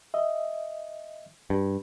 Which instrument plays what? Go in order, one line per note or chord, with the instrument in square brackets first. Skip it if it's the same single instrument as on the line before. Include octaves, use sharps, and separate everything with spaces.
[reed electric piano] D#5 E5
[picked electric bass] G2